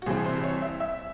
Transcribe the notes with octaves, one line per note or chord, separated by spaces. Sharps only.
F#4
C2 C3 E3 C4 G#4
C5
C#5
E5
E5